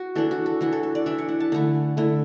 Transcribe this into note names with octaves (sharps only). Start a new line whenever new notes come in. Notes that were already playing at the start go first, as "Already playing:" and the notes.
Already playing: F#4
E3 D4 A4
F#4
A4
E3 D4 F#4
A4
A4
D5
E3 D4 E5
F#5
F#5
A5
D3 A3 E4 F#5
D3 A3 E4